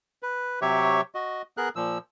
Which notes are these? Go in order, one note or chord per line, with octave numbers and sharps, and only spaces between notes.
B4
C3 F#3 G4 C#5 E5 C#6
F#4 D#5
B3 G#4 A#4 F#6
A#2 F3 E6